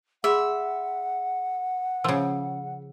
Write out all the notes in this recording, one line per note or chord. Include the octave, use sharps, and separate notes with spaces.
G#4 E5 F#5 B5 C6
C#3 F3 E6